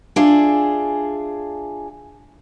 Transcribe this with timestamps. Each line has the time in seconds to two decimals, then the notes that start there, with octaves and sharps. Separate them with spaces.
0.16 D4 F4 G#4 E5